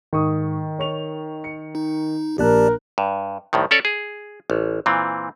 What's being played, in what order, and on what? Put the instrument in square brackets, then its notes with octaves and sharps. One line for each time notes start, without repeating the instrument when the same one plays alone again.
[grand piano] G#2 C#6 D#6 [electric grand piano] D#3
[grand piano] C#5 C#6 F7
C#7
[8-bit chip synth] D#4
[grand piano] A#1 A#3 F#6 [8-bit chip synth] G4 D5 A5 [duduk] A#4
[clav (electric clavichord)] G2
C2 A2 D#3
C#4 A4 C#5 D5
G#4
A1
A#2 E3 C4